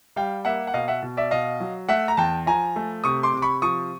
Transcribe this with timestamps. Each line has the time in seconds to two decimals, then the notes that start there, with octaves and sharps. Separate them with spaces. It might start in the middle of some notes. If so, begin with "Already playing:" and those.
0.16 G3 F5 G5
0.45 A#3 E5 F#5
0.67 F#5
0.74 B2 D#5 F5
0.88 E5 F#5
1.03 B2
1.17 D5 E5
1.31 B2 D#5 F5
1.60 F#3
1.89 A3 E5 F#5
2.08 A#5
2.17 E2 G5 A5
2.46 F3 G#5 A#5
2.76 A3
3.04 C3 C#6 D#6
3.23 C6 D6
3.34 C3 D6
3.42 B5 C#6
3.62 F3 C#6 D#6